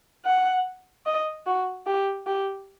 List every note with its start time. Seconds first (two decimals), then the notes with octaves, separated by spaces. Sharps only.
0.25 F#5
1.06 D#5
1.46 F#4
1.86 G4
2.26 G4